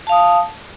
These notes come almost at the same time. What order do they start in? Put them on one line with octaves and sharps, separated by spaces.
A5 F5 D#6